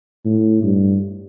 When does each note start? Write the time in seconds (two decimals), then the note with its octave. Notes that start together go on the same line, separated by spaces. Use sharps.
0.25 A2
0.63 G2